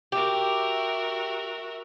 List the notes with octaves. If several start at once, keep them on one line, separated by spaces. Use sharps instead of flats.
F#4 G4 A#4 E5